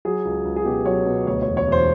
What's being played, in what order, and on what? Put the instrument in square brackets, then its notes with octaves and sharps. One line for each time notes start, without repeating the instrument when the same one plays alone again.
[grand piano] F#3 G#4
C#2
C#2
G#4
B2 G4
F#3 C#5
B2
D2 C#5
E1 C#5
C#5
E1 C5